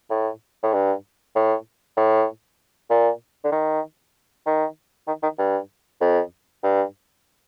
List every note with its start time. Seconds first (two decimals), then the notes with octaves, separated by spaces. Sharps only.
0.10 A2
0.63 A2
0.74 G2
1.36 A2
1.97 A2
2.90 A#2
3.44 D3
3.52 D#3
4.46 D#3
5.07 D#3
5.23 D#3
5.39 G2
6.01 F2
6.64 G2